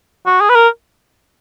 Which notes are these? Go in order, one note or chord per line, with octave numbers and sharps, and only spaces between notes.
F#4
G#4
B4
A#4